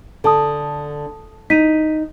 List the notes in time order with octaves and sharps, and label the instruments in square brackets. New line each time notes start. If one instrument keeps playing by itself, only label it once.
[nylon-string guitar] D3 [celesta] A4 A5 D#6
[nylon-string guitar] D#4 [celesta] B6 D#7